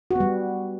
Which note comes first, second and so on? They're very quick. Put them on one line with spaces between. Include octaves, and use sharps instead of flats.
F#4 B3 G3